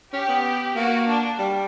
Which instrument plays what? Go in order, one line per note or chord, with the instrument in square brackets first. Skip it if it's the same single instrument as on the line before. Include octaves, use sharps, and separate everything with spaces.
[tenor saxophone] C#4 [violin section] G4
[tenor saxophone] B3
[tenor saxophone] A#3 [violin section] F#4
[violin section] D4
[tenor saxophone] G3